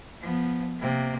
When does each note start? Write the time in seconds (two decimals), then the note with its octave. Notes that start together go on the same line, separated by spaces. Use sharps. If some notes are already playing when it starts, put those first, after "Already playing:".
0.21 F3 B3
0.79 C3 A#3